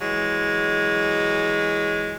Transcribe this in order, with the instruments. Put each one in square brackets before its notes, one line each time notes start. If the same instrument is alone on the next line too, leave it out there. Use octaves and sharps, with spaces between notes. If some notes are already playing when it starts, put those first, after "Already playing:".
[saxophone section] E3 F#3 G#3